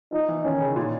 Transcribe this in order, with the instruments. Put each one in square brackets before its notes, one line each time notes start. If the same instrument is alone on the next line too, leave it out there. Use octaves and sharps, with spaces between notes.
[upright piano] F3 [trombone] D#4
[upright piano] E3
[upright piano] D#3 [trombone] C#4
[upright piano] C#3
A#2